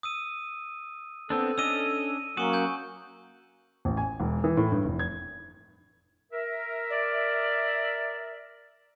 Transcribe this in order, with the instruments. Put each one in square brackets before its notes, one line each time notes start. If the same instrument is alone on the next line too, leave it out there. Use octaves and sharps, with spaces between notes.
[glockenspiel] D#6 E6 D#7
[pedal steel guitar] B3 C4 D4 [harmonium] A4
[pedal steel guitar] C#4 D4 D#5 [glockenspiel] E6 D#7
[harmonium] F#3 A#3 C#4 [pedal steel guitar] F#4 [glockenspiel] C#6 D#6
[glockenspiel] G#5 G6
[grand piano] A1
G#5
E1
E3
A2
G2
F1
G#6
[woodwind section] A#4 E5
[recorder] D5